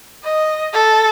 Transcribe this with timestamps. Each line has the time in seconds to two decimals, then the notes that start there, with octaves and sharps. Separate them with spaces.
0.24 D#5
0.74 A4